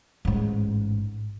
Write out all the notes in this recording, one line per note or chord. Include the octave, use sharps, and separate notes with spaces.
A1 G#2